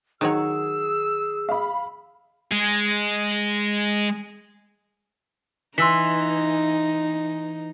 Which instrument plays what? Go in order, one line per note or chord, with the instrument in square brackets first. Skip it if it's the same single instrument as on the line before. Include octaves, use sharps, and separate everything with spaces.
[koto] D#3 F#3 C#5 [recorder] G#4 [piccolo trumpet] E6
[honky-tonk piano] F5 B5
[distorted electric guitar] G#3 G#4
[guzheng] E3 [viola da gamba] D#4 [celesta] C6 E6 B6